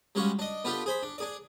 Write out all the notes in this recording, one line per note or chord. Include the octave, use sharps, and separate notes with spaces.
G3 G#3 C#4 F#4 F5
D4 D#5
B3 D4 F4 G4 A4
G#4 C5 B5
D4
D4 G#4 D5